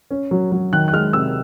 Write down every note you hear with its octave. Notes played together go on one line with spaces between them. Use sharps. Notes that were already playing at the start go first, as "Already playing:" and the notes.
C#4
F#3
F#3
D#3 F#6
F#6
G#3 F6
C3 E6